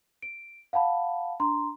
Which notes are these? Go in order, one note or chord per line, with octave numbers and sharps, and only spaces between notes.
D7
F5 F#5 A5 B5
D4 A#5 C6